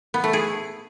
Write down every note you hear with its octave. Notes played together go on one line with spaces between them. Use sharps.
B3
A3
G#4